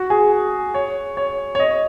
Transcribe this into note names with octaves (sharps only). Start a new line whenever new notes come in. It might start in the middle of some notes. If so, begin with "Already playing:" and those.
Already playing: F#4
G#4
C#5
C#5
C#5
D#5